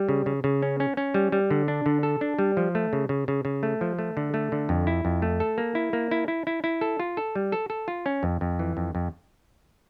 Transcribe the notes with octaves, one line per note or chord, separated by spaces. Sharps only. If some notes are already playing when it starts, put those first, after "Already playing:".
Already playing: G3
C#3
C#3
C#3
C#4
C#4
C#4
G3
G3
D3
D4
D3
A4
D4
G3
F3
A3
C#3
C#3
C#3
C#3
A3
F3
A3
D3
A3
D3
F2
E4
F2
A3
A4
A#3
E4
A#3
E4
E4
E4
E4
A4
F4
A4
G3
A4
A4
F4
C#4
F2
F2
E3
F2
F2